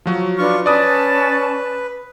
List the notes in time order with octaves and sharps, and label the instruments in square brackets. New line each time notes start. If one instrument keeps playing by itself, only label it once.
[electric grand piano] F3 F#3 F#4
[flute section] D4 B4 F6 [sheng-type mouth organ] F4 C#6
[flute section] C#4 A5 [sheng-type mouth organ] B4 [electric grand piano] D5 D#6